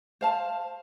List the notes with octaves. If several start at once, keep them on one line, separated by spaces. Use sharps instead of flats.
C5 F5 A5